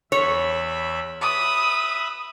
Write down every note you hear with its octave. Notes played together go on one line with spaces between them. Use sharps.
E2 C#5 E5 B5
B4 E5 B5 D#6